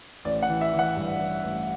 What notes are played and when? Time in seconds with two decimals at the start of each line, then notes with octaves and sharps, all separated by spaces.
0.25 A1 D5
0.42 F#5
0.49 E3
0.61 E5
0.73 E3
0.79 F#5
0.97 G2
1.21 E3
1.44 A1